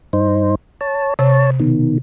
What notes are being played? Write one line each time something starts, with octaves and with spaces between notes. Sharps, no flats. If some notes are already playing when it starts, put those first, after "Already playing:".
G2 D#4 C5
C#5 A5
C3 C#5 A5
B2 D#3